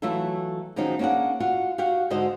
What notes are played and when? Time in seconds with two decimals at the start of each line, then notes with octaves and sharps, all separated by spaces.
0.02 E3 F#3 A3 E4 F4 A4
0.76 D#3 F3 F#3 C#4 D#4 G#4
0.99 A#3 C#4 D4 G#4 F#5
1.40 F4 F#4 F#5
1.78 F#4 G4 F5 F#5
2.10 G#2 D3 F#4 C5 D#5